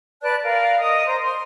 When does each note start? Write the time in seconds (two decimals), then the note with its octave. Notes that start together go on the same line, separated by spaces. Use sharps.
0.22 B4 D5 A5 F#6
0.43 A#4 D5 F5
0.78 A#4 D#5 D#6
1.07 C5 A#5
1.21 C6